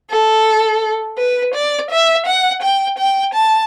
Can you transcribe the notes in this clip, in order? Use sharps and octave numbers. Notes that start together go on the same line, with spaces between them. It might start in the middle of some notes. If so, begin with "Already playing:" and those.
A4
B4
D5
E5
F#5
G5
G5
A5